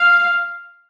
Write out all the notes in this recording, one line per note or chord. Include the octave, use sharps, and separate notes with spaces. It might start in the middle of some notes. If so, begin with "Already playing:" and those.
Already playing: F5